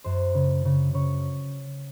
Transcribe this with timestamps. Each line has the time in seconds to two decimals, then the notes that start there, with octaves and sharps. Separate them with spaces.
0.04 F#2 C5
0.35 C#3
0.65 C#3
0.94 C#3 C#5